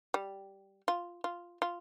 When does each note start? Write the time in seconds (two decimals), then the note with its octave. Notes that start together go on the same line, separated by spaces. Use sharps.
0.14 G3
0.88 F4
1.24 F4
1.62 F4